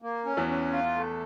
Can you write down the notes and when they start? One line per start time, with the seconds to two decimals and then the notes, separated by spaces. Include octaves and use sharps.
0.02 A#3
0.25 C#4
0.37 E2 E3
0.48 C#4
0.72 F4
0.95 A3